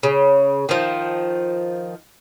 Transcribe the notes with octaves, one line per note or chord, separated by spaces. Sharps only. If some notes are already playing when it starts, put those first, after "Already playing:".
C#3
D#3 F3